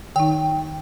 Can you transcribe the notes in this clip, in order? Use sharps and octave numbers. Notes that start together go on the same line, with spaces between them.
D#3 D#4 G5